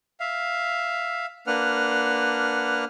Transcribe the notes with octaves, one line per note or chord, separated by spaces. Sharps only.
E5 F5
A#3 D4 B4 F#5 F6